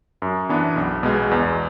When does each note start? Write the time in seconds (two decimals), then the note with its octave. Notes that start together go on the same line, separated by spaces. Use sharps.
0.22 F#2
0.49 E3 B3 D4
0.76 B1
1.03 B2 G#3
1.31 E2